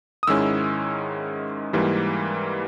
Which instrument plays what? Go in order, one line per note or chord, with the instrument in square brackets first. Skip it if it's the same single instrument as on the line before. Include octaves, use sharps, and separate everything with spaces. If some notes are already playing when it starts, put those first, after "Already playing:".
[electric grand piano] D#6
G#2 D#3 G#3 C#4 E4 E6
G#2 E3 G3 A#3